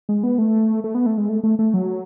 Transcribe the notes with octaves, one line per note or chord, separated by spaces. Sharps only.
G#3
B3
A3
A3
B3
A3
G#3
A3
A3
A3
F#3